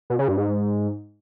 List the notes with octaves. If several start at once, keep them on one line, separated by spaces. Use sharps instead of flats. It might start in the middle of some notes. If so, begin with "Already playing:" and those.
B2
C#3
G2
G#2